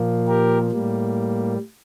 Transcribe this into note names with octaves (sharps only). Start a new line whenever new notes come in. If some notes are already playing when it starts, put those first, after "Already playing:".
Already playing: A#2 F3 A#3
G4 A#4
A2 G3 A#3